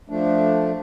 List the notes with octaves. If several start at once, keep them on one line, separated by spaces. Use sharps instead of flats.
F3 A3 D4